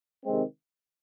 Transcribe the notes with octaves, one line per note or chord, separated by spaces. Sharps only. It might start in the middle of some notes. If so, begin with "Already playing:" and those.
C3 D#3 G#3 C4